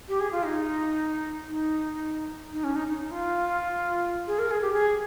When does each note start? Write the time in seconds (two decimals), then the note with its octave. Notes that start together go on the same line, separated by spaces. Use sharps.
0.09 G4
0.20 G#4
0.32 F4
0.43 D#4
1.48 D#4
2.53 D#4
2.64 C#4
2.75 D#4
2.88 D#4
3.11 F4
4.27 G#4
4.39 A#4
4.50 G#4
4.62 G4
4.73 G#4